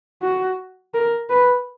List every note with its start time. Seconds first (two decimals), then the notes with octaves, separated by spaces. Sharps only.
0.22 F#4
0.94 A#4
1.30 B4